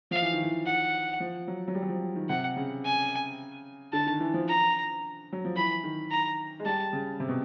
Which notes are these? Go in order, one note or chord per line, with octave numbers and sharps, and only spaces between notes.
F3 F5
E3
D#3
E3
F#5
F3
F#3
F#3
G3
F#3
F3
D#3
C3 F#5
C#3
G#5
D3 A5
D#3
E3
F3
A#5
F#3
F3
E3 B5
D#3
A#5
G#3
G3 A5
C#3
C3
B2